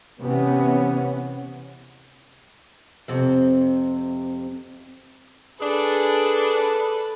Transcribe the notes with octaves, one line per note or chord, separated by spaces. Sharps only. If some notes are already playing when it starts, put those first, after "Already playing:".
C3 E3 B3 C#4
F2 C3
D4 G#4 A4 B4